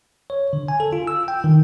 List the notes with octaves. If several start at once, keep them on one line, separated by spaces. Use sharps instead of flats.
C#5
D3
G#5
A4
F4
E6
G5
D#3